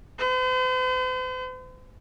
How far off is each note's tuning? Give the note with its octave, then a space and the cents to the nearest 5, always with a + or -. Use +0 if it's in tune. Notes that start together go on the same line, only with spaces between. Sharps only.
C5 -45